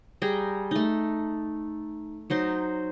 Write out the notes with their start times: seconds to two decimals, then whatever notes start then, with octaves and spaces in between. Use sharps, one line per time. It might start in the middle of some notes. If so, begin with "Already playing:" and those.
0.22 G3 G#4 G5 A#5
0.71 A3 D#4
2.30 F#3 D#4 C5